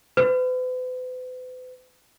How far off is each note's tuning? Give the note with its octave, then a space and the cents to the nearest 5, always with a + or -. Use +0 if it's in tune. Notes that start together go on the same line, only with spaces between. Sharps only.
B4 +45